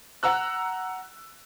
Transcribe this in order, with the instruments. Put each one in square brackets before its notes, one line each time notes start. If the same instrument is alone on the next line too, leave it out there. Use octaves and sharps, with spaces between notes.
[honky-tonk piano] F#5 A#5 E6 F#6